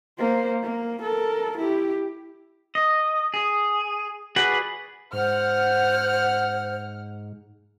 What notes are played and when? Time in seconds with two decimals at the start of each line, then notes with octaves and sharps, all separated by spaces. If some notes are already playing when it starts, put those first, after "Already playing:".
0.18 A#3 C5
0.62 A#3
1.02 A4 A#4
1.58 E4 G4
2.75 D#5
3.34 G#4
4.36 F#4 G#4 B4 D5 F#5
5.13 G#2 C5 F#5 F6